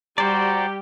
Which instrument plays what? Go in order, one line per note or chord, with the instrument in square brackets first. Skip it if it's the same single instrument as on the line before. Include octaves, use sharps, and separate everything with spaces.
[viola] G3 [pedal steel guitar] F#4 C5 D5 [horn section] G4 [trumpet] A#5